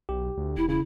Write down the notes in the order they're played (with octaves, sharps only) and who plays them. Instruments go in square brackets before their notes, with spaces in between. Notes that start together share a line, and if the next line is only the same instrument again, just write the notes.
[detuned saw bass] B1 [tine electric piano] G4
[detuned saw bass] D2
[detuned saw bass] E1 [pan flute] E4
[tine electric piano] C#3 [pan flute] E4